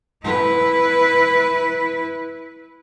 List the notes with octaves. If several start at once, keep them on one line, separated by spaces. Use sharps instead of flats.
E4 B4